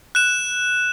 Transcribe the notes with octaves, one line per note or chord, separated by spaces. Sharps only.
F#6 E7